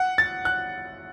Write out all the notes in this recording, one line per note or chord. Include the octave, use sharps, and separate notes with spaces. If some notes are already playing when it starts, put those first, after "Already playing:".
Already playing: F#5
A6
F#6